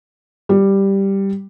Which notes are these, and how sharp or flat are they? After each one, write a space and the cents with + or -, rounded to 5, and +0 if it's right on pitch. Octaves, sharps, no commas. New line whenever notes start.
G3 +0